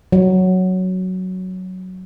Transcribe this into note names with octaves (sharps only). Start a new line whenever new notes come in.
F#3